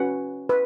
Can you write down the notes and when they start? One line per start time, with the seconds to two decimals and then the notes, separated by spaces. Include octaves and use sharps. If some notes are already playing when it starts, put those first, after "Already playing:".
Already playing: C#4 F#4 B4 F#5
0.49 B4